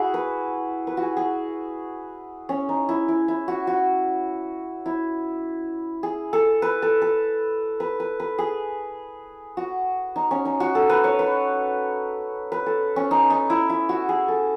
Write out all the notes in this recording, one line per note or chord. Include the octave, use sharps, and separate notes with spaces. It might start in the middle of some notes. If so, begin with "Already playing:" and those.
Already playing: E4 F#4 G#4
B4
B4
F#4 G#4
G#4
C#4
D#4
E4
E4
E4
F#4
F#4
E4
G#4
A4
B4
A4
A4
B4
B4
B4
G#4
F#4
D#4
C#4
D#4
F#4
A4
B4
C#5
B4
B4
A4
C#4
D#4
D#4
E4
E4
F#4
G#4
A4